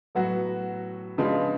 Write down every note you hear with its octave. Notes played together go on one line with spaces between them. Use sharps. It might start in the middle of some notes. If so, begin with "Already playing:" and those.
A2 F#3 B3 F#4
C#3 F3 G#3 B3 D4